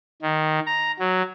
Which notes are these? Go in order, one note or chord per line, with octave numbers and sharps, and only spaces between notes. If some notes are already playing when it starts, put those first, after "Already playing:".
D#3
A#5
F#3